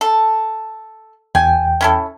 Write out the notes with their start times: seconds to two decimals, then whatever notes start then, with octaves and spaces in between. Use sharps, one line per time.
0.01 A4
1.35 E2 G5 G#5
1.81 C#4 E4 A4